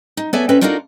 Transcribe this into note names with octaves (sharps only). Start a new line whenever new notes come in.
D#4
B3 A4 C#5 D5 E5 G#5
C4 C#4 A4 B4 E5
D4 D#4 F4 F#4 A4 A#4